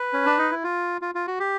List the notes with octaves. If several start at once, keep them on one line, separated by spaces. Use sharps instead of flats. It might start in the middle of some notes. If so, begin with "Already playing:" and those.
Already playing: B4
C#4
D4
D#4
E4
F4
F4
F4
F#4
G4